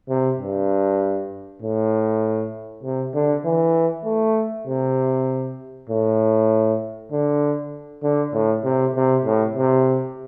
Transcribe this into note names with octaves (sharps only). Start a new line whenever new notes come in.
C3
G2
A2
C3
D3
E3
A3
C3
A2
D3
D3
A2
C3
C3
A2
C3